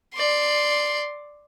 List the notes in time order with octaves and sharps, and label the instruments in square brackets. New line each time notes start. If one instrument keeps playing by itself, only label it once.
[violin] D5 C6